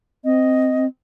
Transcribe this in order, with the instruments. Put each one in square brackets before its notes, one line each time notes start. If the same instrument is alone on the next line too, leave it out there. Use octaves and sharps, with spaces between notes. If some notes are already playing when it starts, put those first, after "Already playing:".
[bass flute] C4 [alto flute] D#5